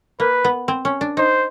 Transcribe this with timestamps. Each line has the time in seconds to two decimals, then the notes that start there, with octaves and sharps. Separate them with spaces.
0.20 A#3 B4
0.44 B3
0.68 C4
0.85 C#4
1.01 D4
1.17 D#4 C5